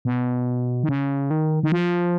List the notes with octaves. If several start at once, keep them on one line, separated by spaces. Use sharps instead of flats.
B2
D#3
C#3
D#3
D#3
F3